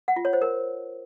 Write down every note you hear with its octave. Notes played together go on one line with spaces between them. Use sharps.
F#5
F4
C#5
C5
A#4